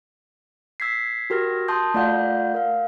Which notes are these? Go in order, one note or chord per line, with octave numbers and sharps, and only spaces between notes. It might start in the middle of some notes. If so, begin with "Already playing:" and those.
E6 G#6 B6 C7
F#4 G4 A#4 F6 G#6 A#6
A5 C6 D#6 G6
A3 F4 D5 F5 F#5 G6
A#4 F5